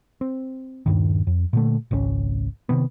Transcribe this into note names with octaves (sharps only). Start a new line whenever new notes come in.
C4
D#1 B1 G2 D#3
F2
A#2 D3 A3
G#1 C#2 C4 C#4
C3 D#3 B3